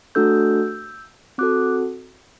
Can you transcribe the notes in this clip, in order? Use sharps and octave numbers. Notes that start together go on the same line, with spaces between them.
A3 D4 F#4 A4 E6 G6
C4 F#4 A4 D6 F#6